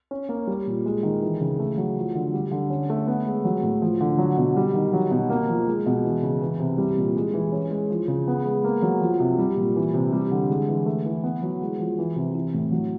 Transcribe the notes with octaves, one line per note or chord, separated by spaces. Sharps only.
C#4
A#3
G3
A#2
G#3
D#3
E3
C#3
A3
F#3
F3
D3
G3
D3
C#4
A3
B3
G#3
F#3
A2
F3
D3
F#3
B2
G3
D#3
F#3
B2
A#3
F3
G#3
B2
E3
C#3
E3
C3
G3
A#2
G#3
E3
C#4
G#3
F3
C#3
B3
G#3
A#3
F#3
F3
C3
G3
A#2
E3
C3
G3
D3
G#3
E3
A3
E3
B3
F#3
G#3
F3
E3
C3
E3
A2
F#3